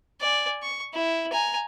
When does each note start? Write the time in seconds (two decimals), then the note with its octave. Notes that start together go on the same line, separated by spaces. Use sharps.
0.21 D5 G#5
0.63 C#6
0.93 E4
1.32 G#5 A#5